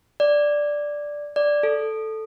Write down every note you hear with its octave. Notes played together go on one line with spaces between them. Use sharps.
D5
D5
A4